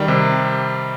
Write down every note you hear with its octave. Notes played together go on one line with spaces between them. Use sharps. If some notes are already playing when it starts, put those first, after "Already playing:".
Already playing: D#3 G3
C3